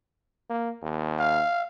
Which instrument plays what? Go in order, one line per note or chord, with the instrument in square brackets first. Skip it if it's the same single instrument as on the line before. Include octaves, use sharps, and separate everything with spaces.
[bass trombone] A#3
D#2
[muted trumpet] F5